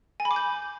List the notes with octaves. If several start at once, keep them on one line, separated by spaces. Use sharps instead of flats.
G#5
B5
D6
G6